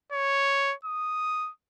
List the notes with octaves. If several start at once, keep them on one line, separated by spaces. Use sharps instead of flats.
C#5
D#6